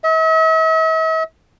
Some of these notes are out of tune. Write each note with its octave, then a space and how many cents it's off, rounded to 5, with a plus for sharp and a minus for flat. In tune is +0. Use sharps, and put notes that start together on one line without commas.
E5 -45